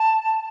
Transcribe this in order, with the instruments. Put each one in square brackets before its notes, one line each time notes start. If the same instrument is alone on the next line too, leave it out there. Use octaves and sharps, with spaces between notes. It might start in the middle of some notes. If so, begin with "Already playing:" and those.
Already playing: [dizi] A5